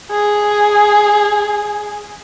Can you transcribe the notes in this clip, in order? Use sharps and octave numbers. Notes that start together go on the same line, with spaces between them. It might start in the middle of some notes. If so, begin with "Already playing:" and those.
G#4